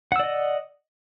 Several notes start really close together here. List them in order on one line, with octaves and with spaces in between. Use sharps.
F#5 E6 D5 D#5